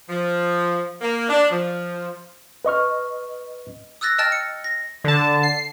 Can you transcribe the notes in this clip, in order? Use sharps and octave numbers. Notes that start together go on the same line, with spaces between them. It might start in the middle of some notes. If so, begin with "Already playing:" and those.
F3
A#3
D4
F3
B4 D#5 C#6 F6
D#6 E6 F#6 A6 A#6
D#5 G5 A5 F6 A6
C#7
A#6
D3 A5
C7